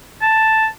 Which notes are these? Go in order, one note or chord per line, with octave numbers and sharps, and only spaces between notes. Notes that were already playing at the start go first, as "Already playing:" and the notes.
A5